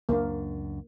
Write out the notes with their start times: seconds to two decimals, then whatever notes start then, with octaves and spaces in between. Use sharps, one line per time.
0.09 C#2 F#2 A#3 D4